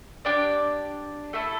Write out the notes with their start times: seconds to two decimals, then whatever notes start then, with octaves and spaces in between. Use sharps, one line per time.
0.25 D4 G4 D5
1.33 A3 E4 A4